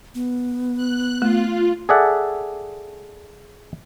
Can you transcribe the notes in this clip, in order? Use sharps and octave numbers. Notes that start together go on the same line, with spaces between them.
B3
F#6
A3 F4
G#4 A4 D5 E5 F#5